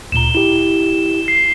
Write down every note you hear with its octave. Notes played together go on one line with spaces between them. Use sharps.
D2 A#2 A#5 E7 G7
E4 G4 E7
C7